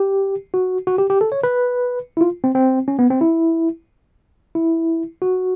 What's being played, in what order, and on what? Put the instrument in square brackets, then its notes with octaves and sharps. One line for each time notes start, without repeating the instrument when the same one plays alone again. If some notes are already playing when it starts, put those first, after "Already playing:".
Already playing: [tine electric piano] G4
F#4
F#4
G4
G4
A4
C#5
B4
E4
F4
C4
C4
C#4
B3
C4
E4
E4
F#4